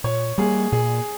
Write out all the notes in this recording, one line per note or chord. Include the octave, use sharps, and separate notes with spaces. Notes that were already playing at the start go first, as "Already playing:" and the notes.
A#2 C#5
G3 A#3 G#4
A#2 G#4